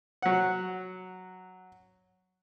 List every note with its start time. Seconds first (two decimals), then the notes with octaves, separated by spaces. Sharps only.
0.22 F#3 F#5